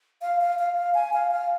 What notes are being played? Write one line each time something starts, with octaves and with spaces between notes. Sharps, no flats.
F5
F5
F5
F5
G#5
F5
F5